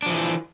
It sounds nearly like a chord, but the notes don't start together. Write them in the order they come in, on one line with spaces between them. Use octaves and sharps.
D4 F3 E3